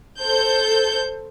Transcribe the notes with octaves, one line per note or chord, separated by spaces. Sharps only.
A4 C5 G6